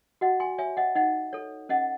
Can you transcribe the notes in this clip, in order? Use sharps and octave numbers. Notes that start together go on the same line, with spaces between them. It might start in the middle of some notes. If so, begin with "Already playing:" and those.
F#4 D#5 F#5
G#5 C6
C#5 E5 G#5
D#5 F#5
D#4 D#5 F#5
A4 C#5
C#4 D#5 F#5